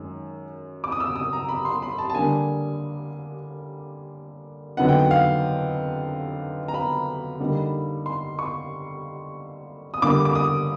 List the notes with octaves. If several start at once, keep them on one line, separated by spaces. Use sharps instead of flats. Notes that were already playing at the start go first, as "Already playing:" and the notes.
Already playing: F#2 D#3 G#3
D6
D#6
E6
D#6
A#5
B5
C6
B5
A5
A5
D3 G3 A#3 D4 G#5
F2 D3 F#3 B3 D#4 F#5
G5
F#5
F5
A#5
B5
D3 G3 A#3 D#4
C6
C#6
D#6
D3 G3 A#3 D6
D6
D#6